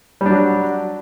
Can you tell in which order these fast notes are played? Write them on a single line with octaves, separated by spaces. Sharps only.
G3 D4 F#3